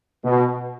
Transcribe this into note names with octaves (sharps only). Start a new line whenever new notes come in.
B2